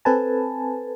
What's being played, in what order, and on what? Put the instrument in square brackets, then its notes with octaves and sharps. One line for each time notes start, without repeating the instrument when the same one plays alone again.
[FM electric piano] C4 A4 B4 G#5 A5